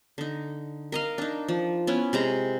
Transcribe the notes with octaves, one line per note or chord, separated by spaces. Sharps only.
D3 D#4
A#4 D#5 F5
D4 D#4
F3
B3 C#4 E4
C3 G#3 A#5